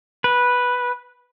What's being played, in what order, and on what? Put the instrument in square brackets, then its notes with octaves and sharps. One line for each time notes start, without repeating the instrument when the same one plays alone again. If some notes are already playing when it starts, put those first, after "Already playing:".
[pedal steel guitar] B4